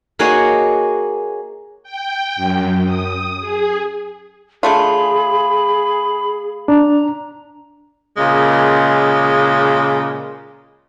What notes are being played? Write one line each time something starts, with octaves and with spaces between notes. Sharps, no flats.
A#3 F#4 G#4 C#5 D#5 F#5
G5
F#2
D#6
G#4
D3 A3 F4 G#4 B5
D4 A#5
A#2 C#3 G#3